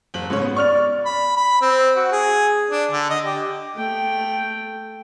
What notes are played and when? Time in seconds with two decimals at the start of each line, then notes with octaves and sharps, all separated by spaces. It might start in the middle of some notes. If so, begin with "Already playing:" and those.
0.14 F#1 F#7
0.30 G#2 C#3 C#5
0.42 B3
0.56 D5 C#6 F6 F7
1.05 B5
1.37 B5
1.61 C4
1.96 F#4
2.12 G#4
2.70 D4
2.92 D3
3.10 D#5
3.25 G4
3.76 A3 G5